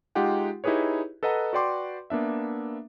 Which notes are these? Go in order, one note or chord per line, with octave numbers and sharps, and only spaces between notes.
G#3 D#4 F4 G4 F#5 G5
D#4 E4 G4 G#4 B4 C#5
A4 B4 D#5 F#5 A#5
F#4 B4 D5 G5 C6 D6
A#3 B3 D4 E5